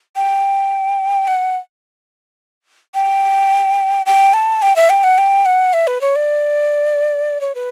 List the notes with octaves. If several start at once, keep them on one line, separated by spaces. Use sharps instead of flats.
G5
F#5
G5
G5
A5
G5
E5
G5
F#5
G5
F#5
E5
B4
C#5
D5
C#5
B4